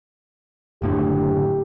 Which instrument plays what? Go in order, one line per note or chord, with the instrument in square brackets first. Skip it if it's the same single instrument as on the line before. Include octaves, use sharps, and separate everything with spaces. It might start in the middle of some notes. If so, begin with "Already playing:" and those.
[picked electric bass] F#1 A2 D3 [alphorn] G4